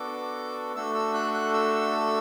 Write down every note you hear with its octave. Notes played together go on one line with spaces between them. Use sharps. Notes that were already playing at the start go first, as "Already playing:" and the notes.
Already playing: B3 D4 F#4 A4 D6
A3 D4 F#4 A4 E6
E6
F#6
F#6
E6